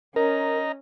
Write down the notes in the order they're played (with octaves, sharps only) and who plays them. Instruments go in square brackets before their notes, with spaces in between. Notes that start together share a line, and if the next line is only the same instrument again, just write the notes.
[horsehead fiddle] C#4 [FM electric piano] A#4 [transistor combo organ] D#5 A#5